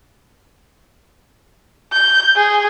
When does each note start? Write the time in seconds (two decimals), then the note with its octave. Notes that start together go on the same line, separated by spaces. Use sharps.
1.93 G6
2.36 G#4